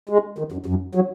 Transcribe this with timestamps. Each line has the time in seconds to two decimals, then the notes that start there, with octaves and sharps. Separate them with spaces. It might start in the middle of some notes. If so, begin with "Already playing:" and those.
0.09 G#3
0.38 D#3
0.52 F#2
0.66 F#2
0.95 F#3